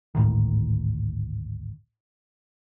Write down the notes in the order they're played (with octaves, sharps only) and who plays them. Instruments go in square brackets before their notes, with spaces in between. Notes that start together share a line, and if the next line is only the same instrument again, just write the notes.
[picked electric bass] G#1 D2 A2 D#3